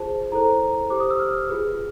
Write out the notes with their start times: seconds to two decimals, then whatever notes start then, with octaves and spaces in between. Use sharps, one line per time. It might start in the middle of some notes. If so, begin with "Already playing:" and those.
Already playing: F4 G#4 C5 A5
0.32 E4 A4 C5 A#5
0.90 G4 C5 D6
1.00 D#6
1.11 E6
1.19 F6
1.49 F4 G#4 B4